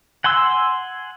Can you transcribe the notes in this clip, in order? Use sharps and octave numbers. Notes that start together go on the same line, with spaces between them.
F#5 G#5 C6 E6